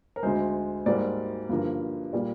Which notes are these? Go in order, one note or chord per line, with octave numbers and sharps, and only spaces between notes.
A#4
D2 D3 G#3 C5
G#2 G3 A#3 D5
G2 D3 F3 A#3
A#2 G3 A#3 D5